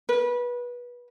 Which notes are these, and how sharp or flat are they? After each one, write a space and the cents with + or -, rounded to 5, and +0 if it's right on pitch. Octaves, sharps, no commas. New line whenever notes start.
B4 -25